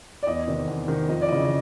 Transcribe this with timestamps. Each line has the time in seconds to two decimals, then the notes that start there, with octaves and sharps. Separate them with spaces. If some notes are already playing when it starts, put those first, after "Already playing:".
0.23 D5
0.27 E2 D#5
0.47 C3 D#3
0.68 E2
0.88 C3 D#3
1.08 F2 D#5
1.22 D5
1.28 C#3 E3 D#5
1.45 D#5